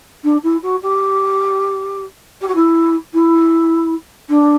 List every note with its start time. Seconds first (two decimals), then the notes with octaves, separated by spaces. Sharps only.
0.24 D4
0.43 E4
0.62 F#4
0.82 G4
2.41 G4
2.48 F#4
2.55 E4
3.14 E4
4.29 D4